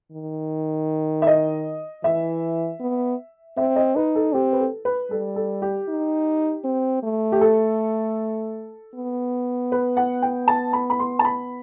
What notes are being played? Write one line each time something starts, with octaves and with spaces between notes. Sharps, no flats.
D#3
E5
D#5
E3 E5
B3
C4 E5
D#5
D#4 B4
A4
C4 G4
B4
A4
B4
G3 A4
A4
G4
D#4
C4
A3
G4
A4
B3
B4
F#5
G5
A5
B5
B5
C6
A5
B5